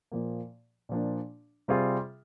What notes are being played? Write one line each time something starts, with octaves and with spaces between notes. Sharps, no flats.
A#2 F3 A#3
A#2 F3 A#3 D4
C3 G3 C4 F4 G#4